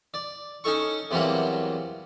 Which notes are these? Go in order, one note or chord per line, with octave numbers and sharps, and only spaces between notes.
D5
C#4 D#4 A4 C#6
E2 C3 E3 F#3 G3 A#3